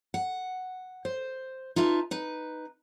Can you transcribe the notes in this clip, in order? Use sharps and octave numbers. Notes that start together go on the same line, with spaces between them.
F#5
C5
D#4 F4 B4 E5 A5
D#4 B4